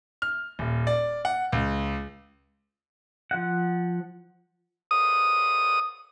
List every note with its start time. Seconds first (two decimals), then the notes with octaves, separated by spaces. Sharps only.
0.22 F6
0.59 D#1
0.87 D5
1.25 F#5
1.52 C#2
3.31 F3 F#5
4.91 D#6